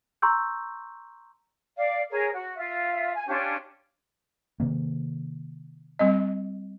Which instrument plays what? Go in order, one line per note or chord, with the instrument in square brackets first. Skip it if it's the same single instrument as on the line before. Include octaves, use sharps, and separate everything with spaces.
[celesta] A#5 C6 C#6 E6 G6
[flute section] D5 F5
G#4 A#4 C#5
F#4
F4 E5
G#5
C#4 D4 F4 G4
[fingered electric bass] C3 D#3 A#3
[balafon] G3 C4 D#5